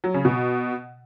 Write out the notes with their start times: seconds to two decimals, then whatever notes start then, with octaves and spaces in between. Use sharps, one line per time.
0.04 F#3
0.14 C#3
0.25 B2